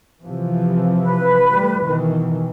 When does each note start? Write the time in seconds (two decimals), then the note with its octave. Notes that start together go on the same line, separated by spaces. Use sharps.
0.23 C3 E3 F3
1.02 B4
1.53 G3 A3
1.82 B2 D#3 E3